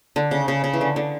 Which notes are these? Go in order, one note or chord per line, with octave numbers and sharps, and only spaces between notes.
D3
C#3
C#3
C#3
E3
D3
D3